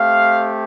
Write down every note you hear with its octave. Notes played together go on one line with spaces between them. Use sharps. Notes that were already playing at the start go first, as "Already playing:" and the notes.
Already playing: A3 C4 G4 F5